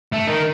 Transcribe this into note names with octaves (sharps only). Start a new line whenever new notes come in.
A3
D#3